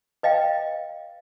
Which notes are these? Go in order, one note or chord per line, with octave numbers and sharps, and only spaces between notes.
B4 D#5 F5 G5